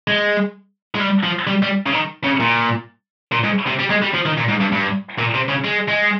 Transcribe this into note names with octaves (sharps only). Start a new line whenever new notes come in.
G#3
G#3
G3
F3
G3
G3
C#3
D#3
C#3
A#2
A#2
G#2
C3
G3
G#3
G3
F3
D#3
A#2
G#2
G2
G2
A#2
C3
C#3
G#3
G#3